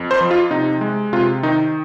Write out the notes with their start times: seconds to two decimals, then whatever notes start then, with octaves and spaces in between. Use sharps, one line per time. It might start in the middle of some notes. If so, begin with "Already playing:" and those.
Already playing: F2
0.11 C5
0.21 F3
0.31 F4
0.51 C3 D#4
0.81 G#3
1.13 C3 F4
1.43 D#3 D#4